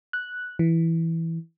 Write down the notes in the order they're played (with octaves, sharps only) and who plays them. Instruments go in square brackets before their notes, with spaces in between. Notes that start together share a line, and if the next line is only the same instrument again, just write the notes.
[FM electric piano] F#6
E3